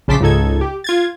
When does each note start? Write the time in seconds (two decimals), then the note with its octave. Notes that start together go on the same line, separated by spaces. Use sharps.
0.08 A#1 C#3 A5 C6 D6 B6
0.20 C#2 G#2 D#4 A4 G#6
0.61 G4
0.84 F4 G#6 A6